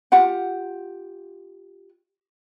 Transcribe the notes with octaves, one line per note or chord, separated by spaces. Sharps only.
F4 G4 F#5